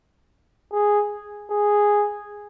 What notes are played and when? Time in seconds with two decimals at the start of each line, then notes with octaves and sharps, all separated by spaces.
0.72 G#4
1.50 G#4